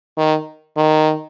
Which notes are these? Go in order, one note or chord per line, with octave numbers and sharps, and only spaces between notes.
D#3
D#3